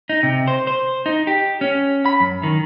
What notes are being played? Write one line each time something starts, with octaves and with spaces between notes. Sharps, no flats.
D#4
C3
C5
C5
D#4
G4
C#4
B5
F#2
D#3